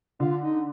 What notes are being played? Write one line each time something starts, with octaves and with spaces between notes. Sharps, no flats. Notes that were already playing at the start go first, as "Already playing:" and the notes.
D3 F4
D#4